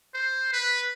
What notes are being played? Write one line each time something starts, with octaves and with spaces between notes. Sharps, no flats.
C5
B4